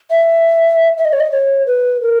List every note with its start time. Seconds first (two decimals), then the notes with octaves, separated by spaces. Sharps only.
0.11 E5
0.98 E5
1.05 D#5
1.13 C#5
1.20 D#5
1.32 C#5
1.67 B4
2.02 A#4